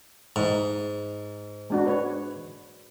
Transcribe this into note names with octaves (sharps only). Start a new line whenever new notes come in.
G#2
G#3 D4 F#4
B4 C#5